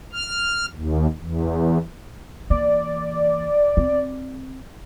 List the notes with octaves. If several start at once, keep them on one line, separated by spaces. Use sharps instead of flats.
F6
D#2
E2
E3 A#3 D5
C4